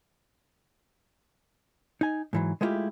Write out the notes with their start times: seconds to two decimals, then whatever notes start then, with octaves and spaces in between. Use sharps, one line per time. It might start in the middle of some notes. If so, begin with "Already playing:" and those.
2.01 D#4 G#5
2.33 G#2 E3 F#3
2.61 G#3 A3 B3 E4 F4 G4